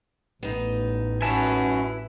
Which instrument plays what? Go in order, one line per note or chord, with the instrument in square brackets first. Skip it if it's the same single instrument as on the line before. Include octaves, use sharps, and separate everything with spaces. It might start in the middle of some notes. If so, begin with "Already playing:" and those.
[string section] A1 [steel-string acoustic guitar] B3 D#4
[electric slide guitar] C#4 F#4 G#5 [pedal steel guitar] E4 B4 A5